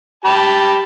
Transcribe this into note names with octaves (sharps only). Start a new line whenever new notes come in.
G4 A5 B5